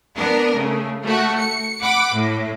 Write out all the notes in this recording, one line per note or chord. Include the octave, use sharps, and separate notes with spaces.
B3 D4 A#4
C#3 A3
A3 F#4
C#7
F#5 B5 D6
A2